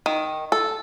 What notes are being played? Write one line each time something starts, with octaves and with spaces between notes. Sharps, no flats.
D#3
A4